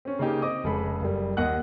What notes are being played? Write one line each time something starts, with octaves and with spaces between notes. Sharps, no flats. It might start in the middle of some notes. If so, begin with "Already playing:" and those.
C4 C#4
C#3 A#3 D#4 G4
C4 D#5 D6 D#6
F1 C#3 G#3 A4 B5
F#1 G3
D#2 D#5 F#5 F#6